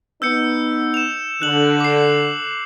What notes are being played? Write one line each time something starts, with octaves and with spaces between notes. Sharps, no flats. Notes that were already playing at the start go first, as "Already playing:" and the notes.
B3 D#4 E6 G6 C#7
E7 F7
D3 F#6 F#7
D6 C7